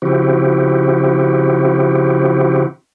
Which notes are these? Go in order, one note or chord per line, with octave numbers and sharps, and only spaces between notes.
C#3 F3 C4 E4 F#4 G4